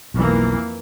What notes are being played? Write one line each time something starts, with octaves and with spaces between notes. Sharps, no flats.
B1 F2 E3 A#3